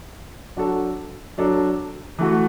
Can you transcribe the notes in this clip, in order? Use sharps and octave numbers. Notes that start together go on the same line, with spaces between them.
F#3 D4 F#4 A4
F#3 D4 A4
E3 A3 F#4